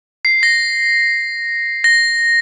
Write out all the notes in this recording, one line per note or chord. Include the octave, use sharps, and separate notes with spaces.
C7
A#6
A#6